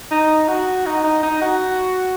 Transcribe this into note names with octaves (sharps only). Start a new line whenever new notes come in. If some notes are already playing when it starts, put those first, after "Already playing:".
D#4
F#4
D#4
D#4
D#4
F#4